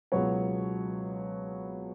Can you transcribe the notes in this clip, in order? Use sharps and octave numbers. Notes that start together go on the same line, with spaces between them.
C#2 B2 F#3 B3 C#5